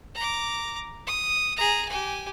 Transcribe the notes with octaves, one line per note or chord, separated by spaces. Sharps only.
A#5 D6
D#6
G#4 A#5
G4 G#5